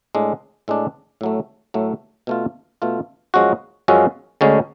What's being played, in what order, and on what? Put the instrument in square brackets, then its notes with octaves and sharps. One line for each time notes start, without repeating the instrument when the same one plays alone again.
[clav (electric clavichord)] A2 G#3 D4
A2 G#3 D4
A2 F#3 A3
A2 F#3 A3
B2 A3 F4
B2 A3 F4
F#2 F3 G#3 C#4 F#4
F#2 F3 G#3 C#4 F#4
D2 D3 G#3 C#4